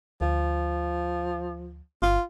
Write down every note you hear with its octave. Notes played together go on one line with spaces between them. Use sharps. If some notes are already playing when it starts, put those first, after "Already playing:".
D2 F3
G1 F4